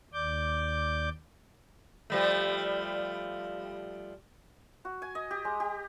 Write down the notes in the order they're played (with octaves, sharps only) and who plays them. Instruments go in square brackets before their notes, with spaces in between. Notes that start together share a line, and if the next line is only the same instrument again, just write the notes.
[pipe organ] D#2 D5 D6 G6
[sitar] F3 G3 A3
[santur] F#4
G#5
D#5
G4
G#3
G4